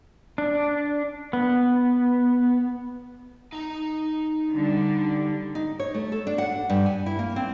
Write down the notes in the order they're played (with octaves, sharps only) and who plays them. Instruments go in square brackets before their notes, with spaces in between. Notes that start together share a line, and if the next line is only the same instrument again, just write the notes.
[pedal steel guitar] D4
B3
[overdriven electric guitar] D#4 A#5
[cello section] D3 G3
[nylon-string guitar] D#4
C#5
A3
A4
D4
F#5
G2
G#5
E4
A#3
C4